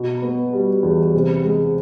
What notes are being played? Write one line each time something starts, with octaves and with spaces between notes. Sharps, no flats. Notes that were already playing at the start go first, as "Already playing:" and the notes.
Already playing: B2
B3
G3
E2
C3
G#3